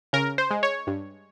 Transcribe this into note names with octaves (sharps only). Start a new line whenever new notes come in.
C#3 A#4
C5
G#3
C#5
G2